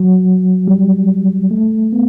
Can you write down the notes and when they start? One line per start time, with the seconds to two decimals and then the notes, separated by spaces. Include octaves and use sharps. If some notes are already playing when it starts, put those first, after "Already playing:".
Already playing: F#3
0.68 G3
1.51 A3
1.93 B3